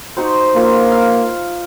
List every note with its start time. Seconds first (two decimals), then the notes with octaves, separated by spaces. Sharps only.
0.17 D#4 F#4 C5
0.56 A#3 F4
0.92 F5